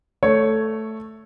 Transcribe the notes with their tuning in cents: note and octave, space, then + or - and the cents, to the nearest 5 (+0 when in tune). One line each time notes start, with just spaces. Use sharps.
A3 +0 C#5 +0